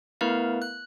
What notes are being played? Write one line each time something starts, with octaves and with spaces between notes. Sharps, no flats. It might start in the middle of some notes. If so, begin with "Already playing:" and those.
A3 B3 E4 A#4 B4 F5
F#6